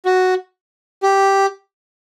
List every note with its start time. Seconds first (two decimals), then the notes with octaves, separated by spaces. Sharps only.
0.05 F#4
1.03 G4